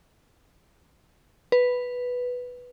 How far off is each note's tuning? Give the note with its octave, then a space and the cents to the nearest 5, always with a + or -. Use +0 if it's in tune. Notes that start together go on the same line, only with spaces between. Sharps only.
B4 +0